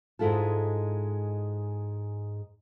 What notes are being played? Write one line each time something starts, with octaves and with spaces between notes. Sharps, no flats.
G#2 G#3 E4 F4 A4